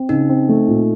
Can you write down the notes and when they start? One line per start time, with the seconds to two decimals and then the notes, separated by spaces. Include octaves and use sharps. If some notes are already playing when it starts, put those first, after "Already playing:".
Already playing: C4
0.09 C#3 D#4
0.29 C4
0.49 A3
0.68 A#2